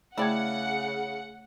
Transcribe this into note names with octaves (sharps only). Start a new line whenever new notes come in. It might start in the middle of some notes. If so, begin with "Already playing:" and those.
C#3 A3 E4 D5 F#5 G5 G#6